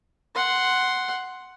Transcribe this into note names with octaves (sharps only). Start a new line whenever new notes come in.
F#5 C6